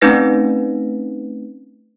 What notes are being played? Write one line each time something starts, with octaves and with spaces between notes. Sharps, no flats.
A3 C4 C#4 D#4 B4 A#6